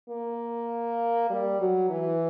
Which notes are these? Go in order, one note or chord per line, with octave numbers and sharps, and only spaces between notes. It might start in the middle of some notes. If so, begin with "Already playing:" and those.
A#3
G3
F#3
E3